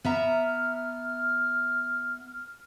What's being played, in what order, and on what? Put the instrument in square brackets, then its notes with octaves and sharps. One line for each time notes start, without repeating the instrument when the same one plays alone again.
[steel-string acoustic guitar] B3 E5 A#5 [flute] F6